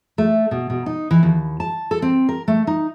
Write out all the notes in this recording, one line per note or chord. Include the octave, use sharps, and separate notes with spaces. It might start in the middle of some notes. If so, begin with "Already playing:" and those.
A3
B2
B2
D#4
E3
D#2
A5
A4
C4
A#4
A3
D#4